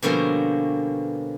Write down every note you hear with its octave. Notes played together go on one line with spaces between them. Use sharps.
B2 D3 F3 G3 A#3 C#4